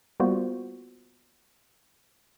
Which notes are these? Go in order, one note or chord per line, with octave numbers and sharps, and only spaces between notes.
G3 A#3 B3 F4 F#4 C5